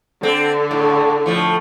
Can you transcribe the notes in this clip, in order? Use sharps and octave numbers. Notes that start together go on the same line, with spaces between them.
D3 C4
A2
A2 F3 A3